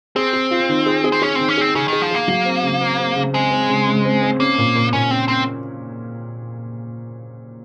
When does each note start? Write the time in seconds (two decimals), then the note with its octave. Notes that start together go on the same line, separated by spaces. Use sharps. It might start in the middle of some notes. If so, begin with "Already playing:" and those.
0.16 C4 G#4
0.33 G#4
0.51 F4
0.69 D#3
0.86 G#4
1.04 G#4
1.12 C4
1.22 C#4 G#4
1.35 D#3 C4
1.49 C#4
1.57 C4 G#4
1.75 C#3 G#4
1.88 D#3 G#4
2.01 F3
2.11 A#3 G#4
2.28 F#3
2.45 C4
2.63 C#3
2.81 C4
2.99 C4
3.16 C#3
3.33 G#3 C4
3.51 C4
3.69 C#3
3.87 C#3
4.05 C4
4.23 C4
4.40 A#3 C#4
4.58 A#2
4.75 A#2
4.93 A#2 C#4
5.11 C4 C#4
5.28 C4 C#4